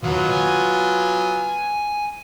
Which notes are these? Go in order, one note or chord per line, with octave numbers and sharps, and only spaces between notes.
D#2 F#3 B3 F4
G#5